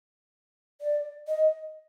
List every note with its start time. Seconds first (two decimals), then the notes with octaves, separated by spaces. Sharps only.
0.81 D5
1.28 D#5